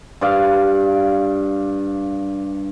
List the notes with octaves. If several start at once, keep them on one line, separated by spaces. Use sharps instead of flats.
G2 D5 F5